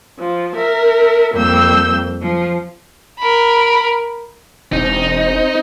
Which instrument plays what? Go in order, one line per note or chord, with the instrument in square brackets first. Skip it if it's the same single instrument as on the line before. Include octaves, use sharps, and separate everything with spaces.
[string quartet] F3
A#4 E5
F2 G3 A#3 E6 G6
F3
[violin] A#4 B5
[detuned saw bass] E1 [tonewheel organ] C4 [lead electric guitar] D#4